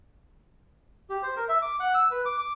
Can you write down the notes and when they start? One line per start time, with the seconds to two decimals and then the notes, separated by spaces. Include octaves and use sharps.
1.10 G4
1.23 C5
1.36 A#4
1.49 E5
1.62 D6
1.80 F#5
1.94 E6
2.11 B4
2.25 D6
2.38 D6